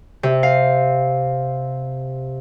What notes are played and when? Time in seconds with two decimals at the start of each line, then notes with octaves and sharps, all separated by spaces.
0.23 C3
0.43 F5